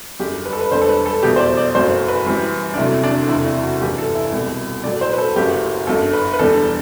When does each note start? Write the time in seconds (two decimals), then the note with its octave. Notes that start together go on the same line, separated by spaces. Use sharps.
0.20 F#2 D3 G3 G4
0.46 B4
0.53 A4
0.61 B4
0.71 E1 D2 D3 G3 C5
0.82 A4
0.89 B4
1.06 A4
1.23 E2 B2 F#3 A3 G4
1.36 C5
1.39 D5
1.57 D5
1.74 F#1 F#2 F#3 A3 C5
2.08 B4
2.26 F#2 E3 G3
2.74 D4
2.77 D2 C3 F#3 A3 E4
3.03 D4
3.29 E1 D2 C3 E4
3.46 E4
3.63 F#4
3.81 G1 F#2 E3 G4
3.98 A4
4.15 E4
4.32 C2 B2 G3
4.84 B1 A2 F#3 D5
5.01 C5
5.13 B4
5.18 A4
5.36 F#1 F#2 F#3 A3 G4
5.87 G1 F#2 D3 A4
6.13 B4
6.34 B4
6.39 E1 E2 D3 G3 A4